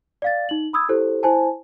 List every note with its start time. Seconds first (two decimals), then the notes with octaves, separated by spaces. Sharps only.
0.22 D5 F5 A6
0.49 D#4 F#7
0.73 B5 D#6 E6 G#6
0.89 E4 G4 A4 C5
1.23 E4 C5 G#5 A5